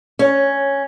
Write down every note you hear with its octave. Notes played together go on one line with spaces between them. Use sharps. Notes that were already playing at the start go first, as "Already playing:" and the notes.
C#4